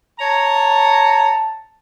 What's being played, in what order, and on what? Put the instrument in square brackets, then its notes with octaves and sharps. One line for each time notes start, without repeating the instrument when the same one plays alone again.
[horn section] C#5 A#5 [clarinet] A5